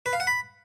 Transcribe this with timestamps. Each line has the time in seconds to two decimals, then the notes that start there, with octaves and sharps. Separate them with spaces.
0.06 B4
0.13 F5
0.20 F#5
0.27 B5